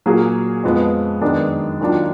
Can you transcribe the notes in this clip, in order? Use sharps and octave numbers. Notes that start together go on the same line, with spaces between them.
A#2 F#3 A#3 F4 G#4
F2 F3 G#3 B3
F#2 D#3 G#3 B3 D4
D#2 D#3 F#3 D4 F4